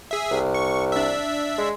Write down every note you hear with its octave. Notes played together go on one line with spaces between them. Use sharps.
G#4 E5
C2
C#6
D4 E5
G#3